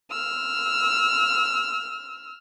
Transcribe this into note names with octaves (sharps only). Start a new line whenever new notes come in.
E6 F6